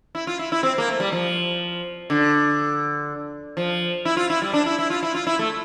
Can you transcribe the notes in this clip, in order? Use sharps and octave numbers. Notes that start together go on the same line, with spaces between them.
E4
F4
E4
E4
C4
A#3
A3
G3
F3
D3
F3
E4
F4
E4
G3
D4
E4
E4
F4
E4
F4
E4
A3